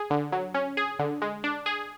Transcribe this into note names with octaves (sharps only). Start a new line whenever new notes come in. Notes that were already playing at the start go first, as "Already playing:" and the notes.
Already playing: G#4
D3
F#3
C#4
G#4
D3
G#3
D4
G#4